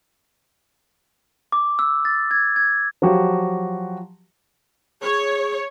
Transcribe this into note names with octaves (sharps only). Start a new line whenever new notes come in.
D6
E6
A6
G#6
G#6
F3 F#3 F#4 G4
G#4 C#5